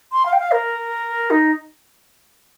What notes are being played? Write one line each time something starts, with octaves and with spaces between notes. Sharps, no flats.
C6
F5
G5
F5
A#4
D#4